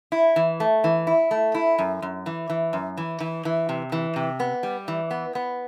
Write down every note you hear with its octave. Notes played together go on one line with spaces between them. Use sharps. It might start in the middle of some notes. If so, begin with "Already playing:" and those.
E4
E3
A3
E3
E4
A3
E4
F#2
F#2
E3
E3
F#2
E3
E3
E3
C3
E3
C3
B3
G3
E3
B3
B3